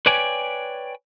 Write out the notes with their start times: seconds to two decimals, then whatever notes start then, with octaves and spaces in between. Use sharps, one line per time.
0.06 B4 C#5 D5 G5 G#5